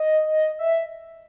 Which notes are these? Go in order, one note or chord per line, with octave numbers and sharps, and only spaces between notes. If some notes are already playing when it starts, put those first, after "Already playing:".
Already playing: D#5
E5